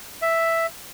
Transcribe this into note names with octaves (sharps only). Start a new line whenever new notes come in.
E5